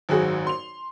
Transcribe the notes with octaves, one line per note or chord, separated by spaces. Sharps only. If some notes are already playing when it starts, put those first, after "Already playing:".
G#1 F#2 F#4 G#4
C6 F7